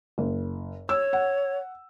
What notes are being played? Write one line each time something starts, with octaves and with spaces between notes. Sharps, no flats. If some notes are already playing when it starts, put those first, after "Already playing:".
F#1
C#5 E6
F#5